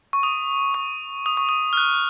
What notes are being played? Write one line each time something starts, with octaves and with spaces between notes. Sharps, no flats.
C#6
D#6
C#6
D#6
C#6
D#6
F6
F#6